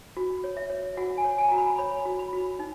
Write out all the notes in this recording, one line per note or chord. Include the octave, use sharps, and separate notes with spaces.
F#4
C#5
E5
C#5
F#4 F#5
G#5
C#5
G#5
F#4 A#5
B5
C#5 B5
F#4
B5
F#4
D#4